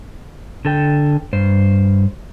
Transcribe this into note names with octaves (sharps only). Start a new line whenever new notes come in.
D3 A4 G5
G2 C5